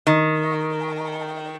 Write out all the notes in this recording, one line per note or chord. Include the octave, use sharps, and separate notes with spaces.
D#3